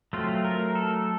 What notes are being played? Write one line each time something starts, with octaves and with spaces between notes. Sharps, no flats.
F#3 A3 C4 F4
A#4
A4